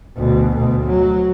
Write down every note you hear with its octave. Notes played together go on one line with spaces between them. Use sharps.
D2 B2
D2 B2
F#3